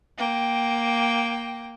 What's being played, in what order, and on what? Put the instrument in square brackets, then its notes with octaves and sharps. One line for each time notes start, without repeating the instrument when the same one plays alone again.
[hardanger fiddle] A#3 G5